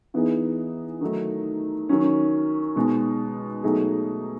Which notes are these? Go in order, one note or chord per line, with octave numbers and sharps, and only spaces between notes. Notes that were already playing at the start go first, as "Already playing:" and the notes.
E3 B3 D#4 G#4
D#3 F#3 A3 D#4
D#3 F#3 C#4
B2 G#3 D#4
B2 F#3 A3 D#4 G#4